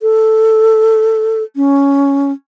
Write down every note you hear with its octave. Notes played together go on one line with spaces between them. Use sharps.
A4
C#4